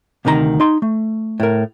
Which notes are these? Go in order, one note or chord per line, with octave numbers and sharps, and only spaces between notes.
D2 C3 D#3 F#4 A#5
D#4 C6
A3
A2 A#4